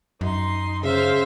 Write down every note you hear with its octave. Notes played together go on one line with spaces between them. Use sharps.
F#2 D#4 C6
C#3 C5 E5 F5